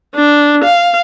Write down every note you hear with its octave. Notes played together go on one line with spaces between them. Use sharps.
D4
F5